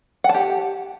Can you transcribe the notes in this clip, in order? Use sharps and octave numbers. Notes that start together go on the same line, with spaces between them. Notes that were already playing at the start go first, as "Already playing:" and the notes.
F#5
A5
G4